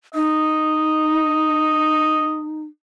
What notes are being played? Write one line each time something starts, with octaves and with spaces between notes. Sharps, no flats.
D#4 D#5